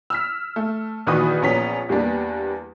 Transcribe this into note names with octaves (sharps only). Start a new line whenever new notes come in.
E6 F6 B6
A3
A#1 D#3 E3 F#4 B5 D#6
A#1 B3 C#4 A#5 B6
E2 G3 A#3 B3 D4